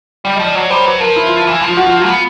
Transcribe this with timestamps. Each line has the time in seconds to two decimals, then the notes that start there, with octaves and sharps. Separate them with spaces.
0.24 G3 D5
0.35 D#5
0.40 F3
0.45 D5
0.55 F#3 C#5
0.70 G3 C5
0.86 F#3 B4
1.00 F3 A#4
1.16 E4
1.27 F4
1.37 F4
1.47 E3
1.61 F3
1.68 F4
1.77 F#4
1.87 F4
1.97 F#4
2.08 B3